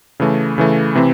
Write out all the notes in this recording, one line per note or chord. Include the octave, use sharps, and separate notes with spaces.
C#3 E3 A3
C#3 E3 A3
C3 E3 C4